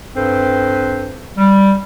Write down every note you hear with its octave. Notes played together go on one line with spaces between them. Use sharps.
G2 C4 A4 B4 C5
G3